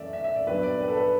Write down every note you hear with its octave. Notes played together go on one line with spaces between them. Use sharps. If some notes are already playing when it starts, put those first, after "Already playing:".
Already playing: F#2 E3 A3 D5 E5
E5
E5
D5
G2 F#3 B3 B4
D5
B4
A4
B4